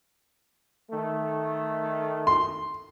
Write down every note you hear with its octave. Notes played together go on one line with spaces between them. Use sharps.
D#3 A3
C6